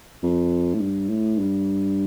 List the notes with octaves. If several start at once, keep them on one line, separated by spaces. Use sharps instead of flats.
F2
A2
G2
A2
G2